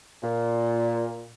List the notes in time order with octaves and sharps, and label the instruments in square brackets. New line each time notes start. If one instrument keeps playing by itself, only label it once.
[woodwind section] A#2